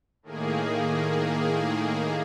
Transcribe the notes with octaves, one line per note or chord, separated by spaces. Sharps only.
A2 D#3 A#3 G#4